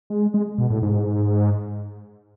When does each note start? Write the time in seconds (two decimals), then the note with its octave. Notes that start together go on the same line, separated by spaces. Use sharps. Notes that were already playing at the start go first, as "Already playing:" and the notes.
0.10 G#3
0.34 G#3
0.58 B2
0.70 A2
0.82 G#2